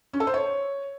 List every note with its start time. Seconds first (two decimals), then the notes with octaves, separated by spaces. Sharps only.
0.13 C#4
0.20 A4
0.27 C5
0.34 C#5